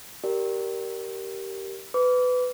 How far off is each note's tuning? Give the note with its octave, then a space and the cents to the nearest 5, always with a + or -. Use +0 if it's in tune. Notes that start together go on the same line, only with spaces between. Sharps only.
G4 -15 A#4 +0 D5 +0
B4 +20 D6 -30